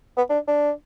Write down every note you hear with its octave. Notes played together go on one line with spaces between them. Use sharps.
B3
D4
D4